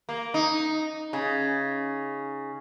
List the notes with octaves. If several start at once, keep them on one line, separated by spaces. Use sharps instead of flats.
A#3
D#4
C#3